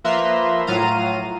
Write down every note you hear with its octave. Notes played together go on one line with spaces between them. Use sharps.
F3 A#3 B4 E5 A#5 C6
A2 F#3 F4 F5 A#5 D#7